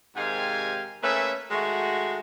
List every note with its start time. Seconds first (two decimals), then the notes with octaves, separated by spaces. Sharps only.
0.17 G#2 C3 D#3 G4 F5 G#5
1.02 A3 A#3 C#4 B4 E5
1.51 D#3 G#3 A3 F#4